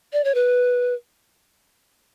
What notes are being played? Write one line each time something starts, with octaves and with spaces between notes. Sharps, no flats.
D5
C#5
B4